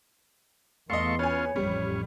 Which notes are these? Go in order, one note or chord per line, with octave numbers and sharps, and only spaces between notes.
E2 A3 B3 D#5 F5 C6 C#6
C#4 F4 B4 C#5 G#5
A1 F2 G3 C#4